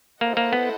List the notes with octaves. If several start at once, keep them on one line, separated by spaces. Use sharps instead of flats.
A#3 E4 A4 C5 D#5 F#5
A#3
B3